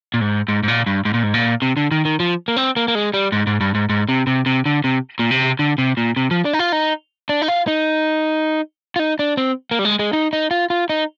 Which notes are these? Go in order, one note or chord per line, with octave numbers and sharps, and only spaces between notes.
A#2
G#2
G#2
G#2
A#2
G2
G#2
A#2
G#2
A#2
C3
D3
D#3
D#3
F3
A#3
C4
A#3
A#3
G#3
G3
G#2
G#2
G2
G#2
G#2
C3
C3
C3
D3
C3
A#2
C3
D3
C3
A#2
C3
F3
D4
D#4
F4
D#4
D4
D#4
F4
D#4
F4
D#4
D4
C4
A#3
G3
G#3
G#3
D#4
D#4
F4
F4
D#4